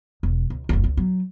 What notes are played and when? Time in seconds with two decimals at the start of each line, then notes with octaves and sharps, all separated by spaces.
0.23 E1
0.50 C#2
0.69 F#1 D2
0.84 C#2
0.97 F#3